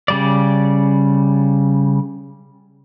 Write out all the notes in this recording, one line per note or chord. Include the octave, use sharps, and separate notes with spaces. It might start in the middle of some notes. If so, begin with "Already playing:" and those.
C#3 G3 D5